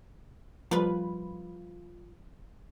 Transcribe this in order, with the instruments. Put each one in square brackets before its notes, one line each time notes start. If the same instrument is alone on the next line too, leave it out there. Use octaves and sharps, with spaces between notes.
[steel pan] F3 G3 [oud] F4 B4